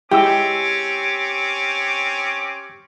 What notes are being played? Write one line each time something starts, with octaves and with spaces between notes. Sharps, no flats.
G#3 C4 C#4 E4 G4 G5 D6 E6